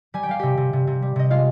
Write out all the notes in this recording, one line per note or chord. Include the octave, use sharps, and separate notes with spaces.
G3 G#5
G5
G3 F5
C3 G4 G5
C3
C3
C3
G3
C3 D#5
G#3 F4 F5